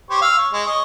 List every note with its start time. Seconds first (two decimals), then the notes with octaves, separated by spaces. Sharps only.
0.10 G4 C5 C#5
0.21 F5 E6
0.38 C#5
0.53 G#3
0.66 C#5 D#5